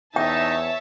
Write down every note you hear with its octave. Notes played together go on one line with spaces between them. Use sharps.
E2 D#4 C#5 E5 G5 A5